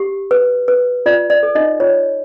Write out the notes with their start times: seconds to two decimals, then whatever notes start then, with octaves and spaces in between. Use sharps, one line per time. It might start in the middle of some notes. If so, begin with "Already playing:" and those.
Already playing: G4
0.31 B4
0.68 B4
1.06 F4 D5
1.30 D5
1.43 A4
1.55 D#4 D#5
1.80 F4 C#5